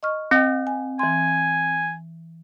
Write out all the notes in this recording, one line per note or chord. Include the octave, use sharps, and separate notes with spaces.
D#5 C#6 F6
C4 D#5 G5
G#5
E3 G#5 C6